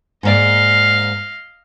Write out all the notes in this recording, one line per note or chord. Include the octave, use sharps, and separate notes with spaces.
G#2 A#3 D5 D#5 F5